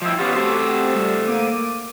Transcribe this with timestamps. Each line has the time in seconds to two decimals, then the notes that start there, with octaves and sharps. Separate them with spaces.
0.02 F3 E4 D#5 G5
0.19 B3 C#4 F4 G4 F#5
0.36 A3 C4 F#4 G4 A4 C5
0.95 G3
1.26 A#3 D6 D#7